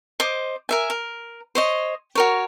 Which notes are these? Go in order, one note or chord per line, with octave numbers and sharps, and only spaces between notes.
C5 D#5 D6 D#6
A#4 E5 G#5
A#4
C5 C#5 D#5
F#4 A#4 C#5